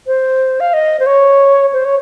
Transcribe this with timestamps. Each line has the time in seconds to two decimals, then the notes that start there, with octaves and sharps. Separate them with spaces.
0.07 C5
0.60 F5
0.73 D#5
1.00 C5
1.06 C#5
1.73 C5
1.85 C#5